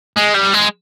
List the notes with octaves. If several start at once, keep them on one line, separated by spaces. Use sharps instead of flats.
G#3
G3
G#3